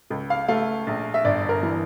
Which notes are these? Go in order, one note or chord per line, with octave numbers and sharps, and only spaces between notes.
C#2
F5
A3 F5
A#1
E5
G1 D5
A#4
E3